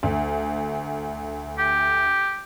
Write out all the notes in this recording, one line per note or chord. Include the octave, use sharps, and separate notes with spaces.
D2
G4